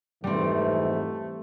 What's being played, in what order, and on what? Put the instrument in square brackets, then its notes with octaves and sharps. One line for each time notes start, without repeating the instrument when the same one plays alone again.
[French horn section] F2 G#2 E3 [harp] G3 C4 [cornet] A3